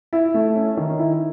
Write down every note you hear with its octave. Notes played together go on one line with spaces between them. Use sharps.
E4
A3
C#4
D#3
E4